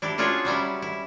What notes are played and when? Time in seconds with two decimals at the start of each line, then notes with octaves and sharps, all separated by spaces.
0.02 D4 E4 G4
0.18 C#4 D4 F4 F#4 G#4 C#5
0.45 F#3 G3 C#4 E4
0.82 E4